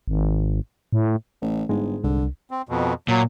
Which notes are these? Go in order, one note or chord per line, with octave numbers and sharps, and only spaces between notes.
G#1
A2
A1
G1 G#2 G#3
C2 D3
C4
F2 B2
A#2 F#3